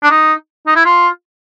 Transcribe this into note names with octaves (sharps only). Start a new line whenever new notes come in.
D4
D#4
D#4
E4
F4